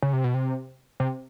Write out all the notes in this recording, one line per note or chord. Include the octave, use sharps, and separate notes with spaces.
C#3
C3
B2
C3
C3